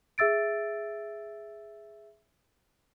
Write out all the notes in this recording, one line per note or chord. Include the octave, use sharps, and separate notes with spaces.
G#4 E5 E6 A6 D7